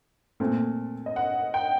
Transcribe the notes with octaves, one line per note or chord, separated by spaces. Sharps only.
A#2 A3 C4
D#5
F#5
G5